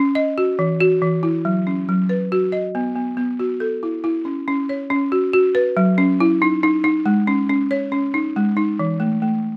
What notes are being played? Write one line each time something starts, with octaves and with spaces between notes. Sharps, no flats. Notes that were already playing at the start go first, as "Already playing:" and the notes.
Already playing: C#4
D#5
F#4
E3
F#4
E3
E4
F#3
C#4
F#3
B4
F#4
D#5
B3
B3
B3
F#4
A4
E4
E4
C#4
C#4
C#5
C#4
F#4
F#4
B4
F#3
C#4
E4
D#4
D#4
D#4
G#3
C#4
C#4
C#5
C#4
D#4
G#3
D#4
E3
A3
A3